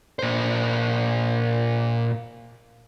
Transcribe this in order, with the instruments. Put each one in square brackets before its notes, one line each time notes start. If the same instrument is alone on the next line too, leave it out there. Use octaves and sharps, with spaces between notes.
[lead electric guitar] A#2 C5